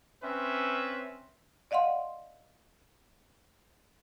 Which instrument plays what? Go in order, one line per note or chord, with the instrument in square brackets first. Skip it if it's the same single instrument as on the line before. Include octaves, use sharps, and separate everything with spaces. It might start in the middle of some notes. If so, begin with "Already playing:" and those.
[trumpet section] C4 C#4 B4 E5
[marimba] D5 D#5 F5 F#5 C6